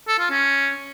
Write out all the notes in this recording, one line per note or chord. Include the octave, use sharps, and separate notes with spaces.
A4
F4
C#4